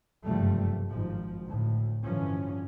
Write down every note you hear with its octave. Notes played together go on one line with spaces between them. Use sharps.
F#1 G2 C3 F3 G3 A3
G#1 G#2 F3
D2 A2
G2 D3 E3 F3 C#4